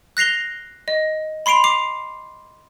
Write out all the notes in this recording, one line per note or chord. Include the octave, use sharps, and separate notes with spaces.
F#6 A#6 C7 F7 G7
D#5
B5 C6 C7 D7 F7
D6 C7 F7